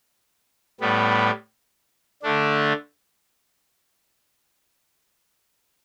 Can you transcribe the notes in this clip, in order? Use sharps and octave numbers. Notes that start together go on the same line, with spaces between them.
A2 G3 B3
D3 A3 D4